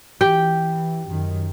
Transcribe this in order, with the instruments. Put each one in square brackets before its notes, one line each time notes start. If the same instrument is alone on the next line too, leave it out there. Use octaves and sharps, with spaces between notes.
[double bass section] E3 [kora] G4 G5
[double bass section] F#2 D#3